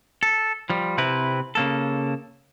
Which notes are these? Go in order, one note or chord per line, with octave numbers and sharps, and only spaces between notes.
A4
F3 G3
C3 C4 E4 B4
C#3 A#3 A4